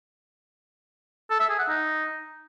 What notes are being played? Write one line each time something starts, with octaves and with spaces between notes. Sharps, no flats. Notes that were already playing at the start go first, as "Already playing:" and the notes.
A4
E5
G#4
F#5
D#4